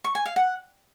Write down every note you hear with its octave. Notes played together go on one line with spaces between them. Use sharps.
C#6
G#5
F5
F#5